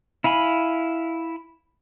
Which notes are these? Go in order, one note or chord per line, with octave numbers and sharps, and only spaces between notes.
E4 F5 G#5 B5